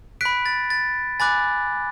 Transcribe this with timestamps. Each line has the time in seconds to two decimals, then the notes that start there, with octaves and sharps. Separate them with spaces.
0.21 B5 F#6 B6 D7
0.46 A6
0.70 A6
1.20 G#5 B5 D6 F#6 A6